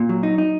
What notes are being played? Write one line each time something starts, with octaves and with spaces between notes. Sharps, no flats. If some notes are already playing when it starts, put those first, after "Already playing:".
Already playing: A#2
F#3
D#4
D#4